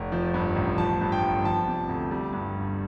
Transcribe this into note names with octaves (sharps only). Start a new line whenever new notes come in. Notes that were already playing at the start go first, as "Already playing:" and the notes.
Already playing: F1
F3
G2
A1
F3 A5
G2
G5
G1
F3 A5
C3
D2
G3
G2
G1